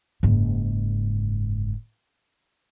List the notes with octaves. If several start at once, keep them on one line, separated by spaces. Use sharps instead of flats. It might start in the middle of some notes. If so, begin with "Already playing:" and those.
F#1 G#2